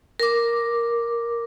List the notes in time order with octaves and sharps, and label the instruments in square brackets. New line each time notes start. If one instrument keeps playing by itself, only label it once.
[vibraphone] A#4 D6